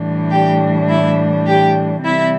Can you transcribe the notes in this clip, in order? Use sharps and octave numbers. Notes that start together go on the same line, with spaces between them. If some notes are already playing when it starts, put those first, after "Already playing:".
Already playing: A2 E3 G3 D4
G4 G5
E4 E5
G4 G5
C3 E3 G3 C4 E4 E5